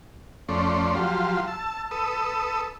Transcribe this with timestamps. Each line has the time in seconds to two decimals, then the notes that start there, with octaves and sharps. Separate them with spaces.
0.49 F2 A3 C#4 D5 C6
0.95 F3 F#3 G4 F5 C6
1.47 A5 E6
1.91 A4 B4 D#6 E6